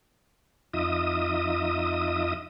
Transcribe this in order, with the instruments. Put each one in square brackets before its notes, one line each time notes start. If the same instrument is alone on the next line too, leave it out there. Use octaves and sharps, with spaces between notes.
[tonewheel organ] F2 D#4 F4 D#5 E5 D#6